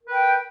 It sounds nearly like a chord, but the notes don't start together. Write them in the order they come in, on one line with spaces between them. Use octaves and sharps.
A#4 B4 G5